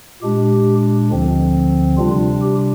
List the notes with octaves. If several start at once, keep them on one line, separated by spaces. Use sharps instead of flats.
A#2 G#3 D4 G4
D2 D3 F3 C4
C3 G3 D4 F4
G4